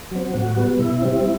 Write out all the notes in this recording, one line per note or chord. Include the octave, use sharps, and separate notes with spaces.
F#3 C4
A2 F#4
G3 B3
B2 E4
G3 C4